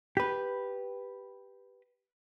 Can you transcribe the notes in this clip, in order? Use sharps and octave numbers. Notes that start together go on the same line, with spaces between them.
G4 B4